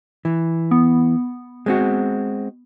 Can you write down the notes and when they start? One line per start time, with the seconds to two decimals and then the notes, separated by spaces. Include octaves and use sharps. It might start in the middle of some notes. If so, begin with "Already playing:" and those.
0.25 E3
0.71 B3
1.66 G#3 C4 F#4